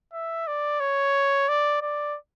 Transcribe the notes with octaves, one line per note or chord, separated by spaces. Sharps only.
E5
D5
C#5
D5
D5